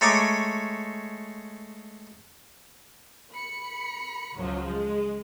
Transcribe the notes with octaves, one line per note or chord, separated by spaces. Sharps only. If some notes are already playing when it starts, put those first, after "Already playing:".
G#3 A3 C#5 G#5 A#5 D6
B5 C#7
C#2 F#2 F3 F#3
G#3